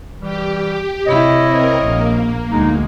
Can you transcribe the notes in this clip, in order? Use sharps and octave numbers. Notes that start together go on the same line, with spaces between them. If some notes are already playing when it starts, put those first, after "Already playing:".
E3 G3 G4
C3 E4 C#5 D#5
C4 A#4
A#1 A#3
D2 G#3 D#4